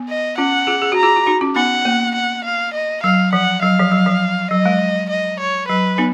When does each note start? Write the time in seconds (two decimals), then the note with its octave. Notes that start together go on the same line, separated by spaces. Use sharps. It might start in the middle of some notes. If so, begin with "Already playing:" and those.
Already playing: B3
0.09 D#5
0.38 C#4 F4 F#5
0.67 F4 G#4
0.82 G#4
0.92 F#4 A#5
1.03 F4 G#4
1.16 F4
1.26 D#4 F#4
1.41 C#4 F4
1.56 B3 D#4 F#5
1.85 A#3
2.15 F#5
2.45 F5
2.74 D#5
3.03 F#3 F5
3.33 F3 F#5
3.62 F#3 F5
3.80 F3
3.92 F#3
4.06 F3
4.51 F#3 D#5
4.66 G#3
5.10 D#5
5.40 C#5
5.69 F#3 B4
5.98 B3 D#4